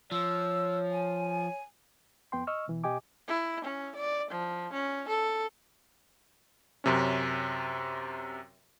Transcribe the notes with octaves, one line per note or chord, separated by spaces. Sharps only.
F3 C#5 E6
G#5
F2 B3 G5 C6
D#5 C#6 E6 F6
B2 E3
B2 G4 D#5 G5 G#5 D6
E4
C#4
D5
F3
C#4
A4
F#2 C3 C#4